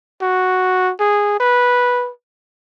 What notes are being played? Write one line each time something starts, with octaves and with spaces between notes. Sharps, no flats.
F#4
G#4
B4